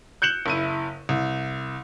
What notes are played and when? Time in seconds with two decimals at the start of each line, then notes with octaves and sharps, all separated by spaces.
0.22 F#6 G6 C#7 E7 F#7
0.46 F#1 E4 D#7
1.09 C2